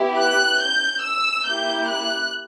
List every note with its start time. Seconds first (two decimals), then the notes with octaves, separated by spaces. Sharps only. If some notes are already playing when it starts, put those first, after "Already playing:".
Already playing: B3 E4 G4
0.18 F#6
0.61 G6
1.03 E6
1.46 A#3 E4 G4 G6
1.89 F#6